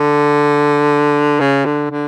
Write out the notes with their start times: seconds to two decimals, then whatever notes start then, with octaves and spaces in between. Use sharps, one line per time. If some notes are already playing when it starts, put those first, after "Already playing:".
Already playing: D3
1.40 C#3
1.66 D3
1.91 D3